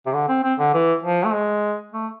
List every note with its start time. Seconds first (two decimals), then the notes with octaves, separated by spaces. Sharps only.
0.06 C3
0.13 D3
0.29 C4
0.43 C4
0.59 D3
0.74 E3
1.03 F3
1.25 A3
1.33 G#3
1.93 A3